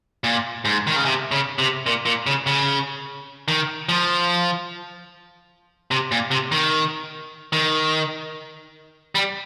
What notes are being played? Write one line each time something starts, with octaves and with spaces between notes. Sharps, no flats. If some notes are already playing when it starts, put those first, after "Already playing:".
A#2
G#2
D#3
C#3
C3
C#3
C3
A#2
A#2
C#3
C#3
D#3
F3
C3
A#2
C3
D#3
D#3
G3